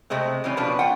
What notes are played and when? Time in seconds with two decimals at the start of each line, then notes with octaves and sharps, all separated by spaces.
0.10 C3 G#3 A3 C4
0.44 C#3 E3 G3 C4 C#4
0.57 B2 F3 C#4 D4 B4 A5
0.79 F4 F#5 G5